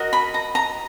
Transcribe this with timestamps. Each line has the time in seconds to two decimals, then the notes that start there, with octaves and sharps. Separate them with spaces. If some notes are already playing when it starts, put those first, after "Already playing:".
Already playing: F#4 A#4 D#5
0.13 B5
0.34 A#5
0.55 A#5